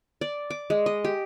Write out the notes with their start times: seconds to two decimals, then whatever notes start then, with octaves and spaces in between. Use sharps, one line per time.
0.21 D5
0.50 D6
0.70 G#3
0.86 D#5
1.05 G4